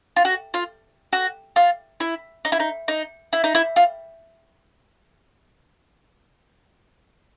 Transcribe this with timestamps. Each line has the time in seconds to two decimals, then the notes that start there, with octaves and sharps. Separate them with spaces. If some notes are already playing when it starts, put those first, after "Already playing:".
0.16 F4
0.25 F#4
0.54 F4
1.13 F#4
1.56 F4
2.00 E4
2.45 D#4
2.52 E4
2.60 D#4
2.88 D#4
3.33 E4
3.44 D#4
3.55 E4
3.76 F4